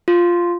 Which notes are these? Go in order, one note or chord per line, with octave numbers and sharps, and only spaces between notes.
F4